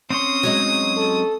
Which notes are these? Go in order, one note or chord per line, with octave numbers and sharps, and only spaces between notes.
C4 C#4 C6 D#6
F#3 G#3 D#4
A4